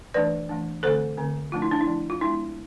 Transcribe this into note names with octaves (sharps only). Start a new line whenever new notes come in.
E3 A3 D4 B4 D5
E3 A3 D4
D3 A3 C4 A4 C5
D3 A3 C4
F3 A3 D4 F4
E4
D4
E4
F3 A3 D4
F4
G#3 B3 D4 E4